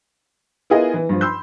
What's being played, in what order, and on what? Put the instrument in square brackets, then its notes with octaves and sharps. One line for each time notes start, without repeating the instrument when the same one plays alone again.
[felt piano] B3 E4 F4 G#4 A#4 D#5
E3
G2 F3
B5 C6 E6 G6